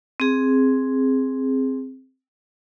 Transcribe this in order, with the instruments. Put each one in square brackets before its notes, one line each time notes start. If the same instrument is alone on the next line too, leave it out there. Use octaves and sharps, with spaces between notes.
[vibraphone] C4 G#4